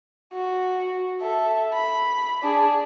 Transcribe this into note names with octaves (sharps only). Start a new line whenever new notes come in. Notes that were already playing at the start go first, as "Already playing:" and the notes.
F#4
A4 E5
B5
D4 G#4